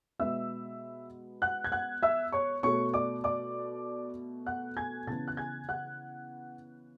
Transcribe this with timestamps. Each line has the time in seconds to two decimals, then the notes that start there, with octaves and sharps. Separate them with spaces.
0.19 B2 G#3 B3 E5 E6
1.42 F#5 F#6
1.64 G#6
1.72 F#5 F#6
2.03 E5 E6
2.32 C#5 C#6
2.63 B2 A3 C#5 C#6
2.94 D5 D6
3.24 D5 D6
4.46 F#5 F#6
4.77 G#5 G#6
5.07 C#3 E3 B3 A5 A6
5.28 F#6
5.37 G#5 G#6
5.69 F#5 F#6